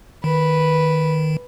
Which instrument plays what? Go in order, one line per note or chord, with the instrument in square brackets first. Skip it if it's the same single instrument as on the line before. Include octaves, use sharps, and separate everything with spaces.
[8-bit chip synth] D#3 [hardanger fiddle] B4